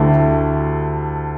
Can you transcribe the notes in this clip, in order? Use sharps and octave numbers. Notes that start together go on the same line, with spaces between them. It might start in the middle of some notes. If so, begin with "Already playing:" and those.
Already playing: D2 D3 A3 E4 G4